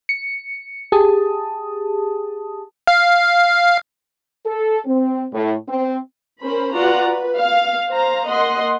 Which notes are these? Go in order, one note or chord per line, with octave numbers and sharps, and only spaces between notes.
C#7
G4 G#4 A5 D#6
F5
A4
C4
A2
C4
C#4 A#4 C5 B5
F4 F#4 B4 D5 F#5 A#5
B4
F5
C5 F5 A#5
A#3 D#5 F#5 C6